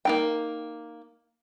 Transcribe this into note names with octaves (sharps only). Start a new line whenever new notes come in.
A#3 D#4 G5